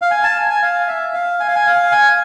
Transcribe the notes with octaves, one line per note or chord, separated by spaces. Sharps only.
F5
G#5
A5
G#5
G#5
F5
E5
F5
G#5
F5
G#5
F5
G#5